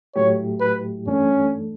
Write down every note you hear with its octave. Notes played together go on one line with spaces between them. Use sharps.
A2 F#3 A3 E4 G4 C#5
B4
G2 E3 A3 C#4 D4 A4